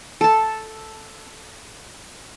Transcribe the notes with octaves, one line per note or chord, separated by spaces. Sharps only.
A4 A5